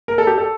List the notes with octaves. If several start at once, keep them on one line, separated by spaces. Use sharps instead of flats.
A#4
A4
G4
A4